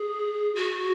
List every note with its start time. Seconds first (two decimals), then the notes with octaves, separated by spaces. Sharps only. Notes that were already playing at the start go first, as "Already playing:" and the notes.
Already playing: G#4
0.55 F#4